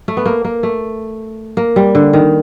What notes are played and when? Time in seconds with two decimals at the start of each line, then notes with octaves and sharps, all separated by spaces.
0.08 A3
0.17 B3
0.26 A#3
0.45 A#3
0.63 A3
1.57 A#3
1.76 G3
1.95 D3
2.13 D#3